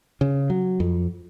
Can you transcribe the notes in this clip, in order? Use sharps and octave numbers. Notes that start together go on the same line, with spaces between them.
C#3
F#3
F2